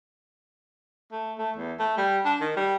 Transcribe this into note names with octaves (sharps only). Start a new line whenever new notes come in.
A3
A3
E2
A3
G3
D4
D#3
G3